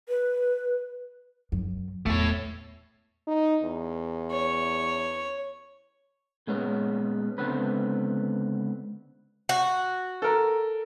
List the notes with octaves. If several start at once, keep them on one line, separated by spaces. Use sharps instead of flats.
B4
F#2
E2 A3 C#5
D#4
E2
C#5
A#2 G#3 B3 C#4
C#2 D3 B3 C4 B4
F#4
A4 A#4